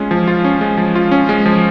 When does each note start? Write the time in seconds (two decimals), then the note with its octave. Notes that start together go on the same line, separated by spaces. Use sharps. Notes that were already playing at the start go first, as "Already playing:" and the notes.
Already playing: G#3 C#4 F4
0.11 F3
0.27 F4
0.44 C#4
0.61 G#3
0.78 F3
0.95 F4
1.11 C#4
1.29 G#3
1.46 F3